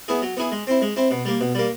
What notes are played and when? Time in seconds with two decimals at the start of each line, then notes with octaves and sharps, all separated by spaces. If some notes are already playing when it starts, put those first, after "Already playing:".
0.08 B3 E4 G#4
0.22 F#3
0.37 B3 E4 G#4
0.52 G#3
0.67 C4 E4
0.82 G#3
0.96 C4 E4
1.11 B2
1.25 G3 A#3
1.41 B2
1.55 G3 A#3